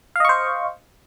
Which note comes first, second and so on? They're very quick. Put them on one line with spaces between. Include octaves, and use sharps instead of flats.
F5 D#5 C#6 C5